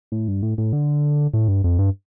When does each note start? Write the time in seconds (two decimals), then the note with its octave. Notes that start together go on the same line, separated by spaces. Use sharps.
0.12 A2
0.28 G2
0.43 A2
0.58 A2
0.73 D3
1.34 A2
1.48 G2
1.64 F2
1.79 G2